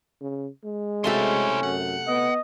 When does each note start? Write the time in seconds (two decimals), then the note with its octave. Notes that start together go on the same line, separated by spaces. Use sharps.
0.21 C#3
0.64 G#3
1.04 C3 A3 C#4 E4 F#4 C5
1.63 F#2 F#5
2.08 B3 D#5